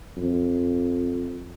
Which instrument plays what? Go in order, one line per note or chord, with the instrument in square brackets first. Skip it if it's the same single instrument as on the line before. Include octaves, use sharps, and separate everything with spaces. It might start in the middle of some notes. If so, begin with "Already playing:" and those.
[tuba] F2